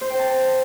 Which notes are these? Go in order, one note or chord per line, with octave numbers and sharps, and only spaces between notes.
C5
G5
A5